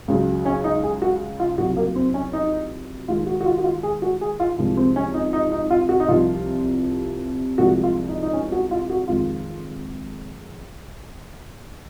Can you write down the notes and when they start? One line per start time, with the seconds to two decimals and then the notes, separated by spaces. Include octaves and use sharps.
0.08 C#2 C#3 F#3
0.45 C#4
0.64 D#4
0.83 G#4
1.02 F#4
1.40 F4
1.58 C2 A#2 F#3 F#4
1.77 A#3
1.95 C4
2.14 C#4
2.33 D#4
3.08 D#2 D#3 G#3 F4
3.27 F#4
3.41 F#4
3.46 F4
3.58 F#4
3.64 F4
3.83 G#4
4.02 F#4
4.21 G#4
4.40 F4
4.58 C2 C3 F3 G#3
4.77 C4
4.96 C#4
5.14 D#4
5.33 D#4
5.52 D#4
5.70 F4
5.89 F#4
6.00 D#4
6.08 C2 C3 F3 F4
7.58 C2 A#2 F3 G#3 F#4
7.83 F4
8.09 D#4
8.23 D#4
8.33 C#4
8.52 F#4
8.71 F4
8.90 F#4
9.08 F2 D#3 G#3 F4